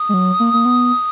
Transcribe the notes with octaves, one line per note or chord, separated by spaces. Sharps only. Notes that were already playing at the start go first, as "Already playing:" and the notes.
Already playing: D#6
G#3
F#3
A#3
A#3
B3